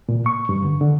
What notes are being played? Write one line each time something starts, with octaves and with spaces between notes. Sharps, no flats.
A#2
C#6
G2
D3
D3